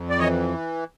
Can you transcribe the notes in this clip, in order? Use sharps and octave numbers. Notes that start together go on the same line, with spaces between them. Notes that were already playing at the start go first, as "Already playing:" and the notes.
Already playing: F2
D5
E3 C#5 D#5